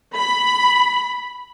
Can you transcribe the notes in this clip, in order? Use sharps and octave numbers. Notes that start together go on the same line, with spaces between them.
B5